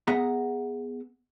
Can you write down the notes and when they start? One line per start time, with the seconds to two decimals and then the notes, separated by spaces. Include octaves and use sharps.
0.07 B3 G#4 E5 F#5 A#5